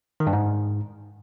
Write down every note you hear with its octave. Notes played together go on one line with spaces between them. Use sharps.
D#3
G2
G#2